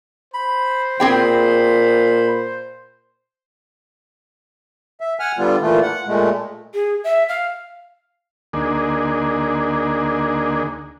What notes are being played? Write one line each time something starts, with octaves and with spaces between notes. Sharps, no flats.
C5 B5
A#2 C4 G#4 G5 B5
E5
F#5 G#5 F6
D3 G3 B3 F4
A#2 E3 A3 F4
F#5
A#2 G#3 A3
G#4
E5
F5
D2 D3 A#3 D#4 G#4